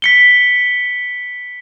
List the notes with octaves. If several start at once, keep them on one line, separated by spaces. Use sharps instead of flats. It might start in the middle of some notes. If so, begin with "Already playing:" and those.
B6 C#7 G7